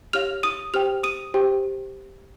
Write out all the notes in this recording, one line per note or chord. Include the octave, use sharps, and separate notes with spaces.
G4 C#5 F5 F6 F7
D#6 D#7
G4 C5 G5 F6 F7
D#6 D#7
G4 C5 G5